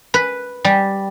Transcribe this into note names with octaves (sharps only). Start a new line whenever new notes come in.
B4
G3